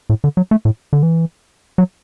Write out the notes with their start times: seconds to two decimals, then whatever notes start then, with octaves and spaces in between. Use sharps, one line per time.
0.10 A2
0.24 D3
0.37 F#3
0.51 A3
0.65 A2
0.93 D3
1.03 E3
1.78 F#3